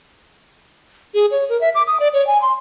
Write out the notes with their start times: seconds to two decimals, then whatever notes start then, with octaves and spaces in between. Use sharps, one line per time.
1.14 G#4
1.31 C#5
1.49 A#4
1.61 E5
1.75 D6
1.87 D#6
2.00 D5
2.13 C#5
2.27 G#5
2.42 C6